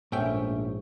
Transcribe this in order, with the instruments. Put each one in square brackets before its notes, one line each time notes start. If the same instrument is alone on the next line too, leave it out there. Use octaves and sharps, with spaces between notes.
[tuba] A#1 [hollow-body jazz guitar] G#2 G5 [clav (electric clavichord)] A3 C#4 E5